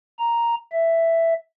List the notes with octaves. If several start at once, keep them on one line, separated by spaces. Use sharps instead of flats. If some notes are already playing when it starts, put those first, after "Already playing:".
A#5
E5